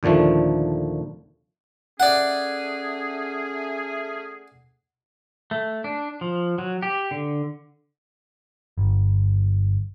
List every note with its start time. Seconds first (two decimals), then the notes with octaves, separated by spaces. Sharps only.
0.03 D#2 A#2 D3 F3 A3
2.00 A3 C#4 G#4 D5 F#5
5.51 A3
5.84 D4
6.21 F3
6.58 F#3
6.82 G4
7.11 D3
8.78 G1